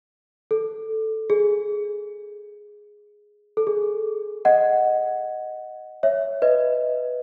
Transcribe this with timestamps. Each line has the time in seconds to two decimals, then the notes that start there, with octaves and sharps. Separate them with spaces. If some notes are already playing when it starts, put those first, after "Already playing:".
0.51 A4
1.30 G#4
3.57 A4
3.67 G#4
4.45 D#5 F#5
6.03 C#5 E5
6.42 B4 D#5